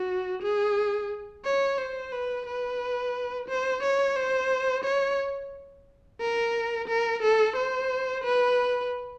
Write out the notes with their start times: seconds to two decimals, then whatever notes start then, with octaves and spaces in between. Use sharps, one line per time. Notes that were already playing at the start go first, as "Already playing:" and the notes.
Already playing: F#4
0.42 G#4
1.45 C#5
1.78 C5
2.12 B4
2.46 B4
3.48 C5
3.83 C#5
4.16 C5
4.84 C#5
6.20 A#4
6.88 A#4
7.22 A4
7.56 C5
8.24 B4